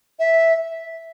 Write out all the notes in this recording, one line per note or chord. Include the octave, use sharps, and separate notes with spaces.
E5